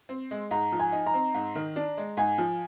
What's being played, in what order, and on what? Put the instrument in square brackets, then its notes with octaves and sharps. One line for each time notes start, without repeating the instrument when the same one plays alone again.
[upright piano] C4
G#3
[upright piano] G#2 [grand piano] A#5
[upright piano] F3
[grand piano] G#5
[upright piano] D#4
[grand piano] A#5
[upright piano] C4
G#2
D#3
D4
G#3
[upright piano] G#2 [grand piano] G#5
[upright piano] F3